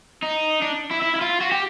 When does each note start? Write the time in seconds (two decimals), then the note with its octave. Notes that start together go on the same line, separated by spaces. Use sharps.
0.22 D#4
0.62 D4
0.91 E4
1.02 E4
1.16 E4
1.21 F4
1.41 F#4
1.51 G4